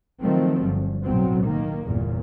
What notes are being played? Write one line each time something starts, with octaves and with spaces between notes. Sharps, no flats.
D#3 F3 F#3 A3 C4
G1
B1 A2 F#3 C4
D#3 A#3
G1 E2 A#2